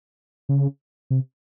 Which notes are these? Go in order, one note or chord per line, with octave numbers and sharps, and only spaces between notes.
C#3
C3